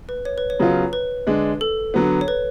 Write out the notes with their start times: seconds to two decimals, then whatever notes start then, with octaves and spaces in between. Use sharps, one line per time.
0.09 B4
0.25 C#5
0.38 B4
0.50 C#5
0.59 C#3 F#3 B3 F4
0.93 B4
1.27 D3 G#3 D4
1.61 A4
1.94 D3 F#3 B3
2.21 C#5
2.28 B4